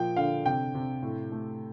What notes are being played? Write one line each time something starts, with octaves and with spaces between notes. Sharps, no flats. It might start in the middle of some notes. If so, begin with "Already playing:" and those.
Already playing: A#2 F3 G5
D3 F5
C3 G5
C3
A2
A3